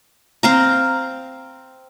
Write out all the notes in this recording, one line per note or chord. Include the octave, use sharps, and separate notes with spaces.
C4 F5 A#5